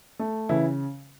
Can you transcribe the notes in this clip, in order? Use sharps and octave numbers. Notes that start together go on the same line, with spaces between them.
A3
C#3 E3 E4